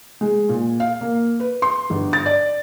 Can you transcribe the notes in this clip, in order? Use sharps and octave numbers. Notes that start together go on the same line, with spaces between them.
G#3
A#2
F5
A#3
B4
C6
G1
A6
D5